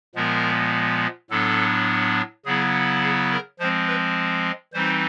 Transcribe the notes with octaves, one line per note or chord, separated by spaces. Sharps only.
A#2 F3 G#3 B3 A#4
A2 F#3 B3 D4 A4
C#3 F#3 B3 E4 G#4
G#4
A#4
F3 G#3 C4 C5
B4
E3 G3 C4 D#4 C5